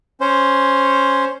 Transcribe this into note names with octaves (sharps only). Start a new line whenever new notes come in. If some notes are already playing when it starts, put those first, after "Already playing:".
C#4 C5